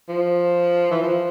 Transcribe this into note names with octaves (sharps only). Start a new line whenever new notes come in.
F3
E3
F3